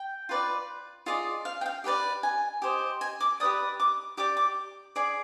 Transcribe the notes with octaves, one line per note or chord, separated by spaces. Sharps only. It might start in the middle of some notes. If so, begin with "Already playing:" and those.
Already playing: G5
F4 B4 D5
F4 G#4 D5 D#5
F5
G5
F5
G4 B4 D5 G5
G#5
G4 C5 D#5
G#5
D6
G4 B4 D5 D#6
D6
G4 D5 D6
D6
G#4 D5